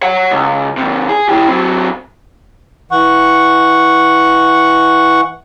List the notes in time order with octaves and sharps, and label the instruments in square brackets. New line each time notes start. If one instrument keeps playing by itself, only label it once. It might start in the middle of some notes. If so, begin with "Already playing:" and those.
[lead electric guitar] C#5 F#5
C#2
D#2 C3
G#4
E3 G4
F#3 C4
[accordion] E3 F#5 C#6